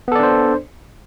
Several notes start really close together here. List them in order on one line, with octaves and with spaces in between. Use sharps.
B3 A4 D5 D4 C5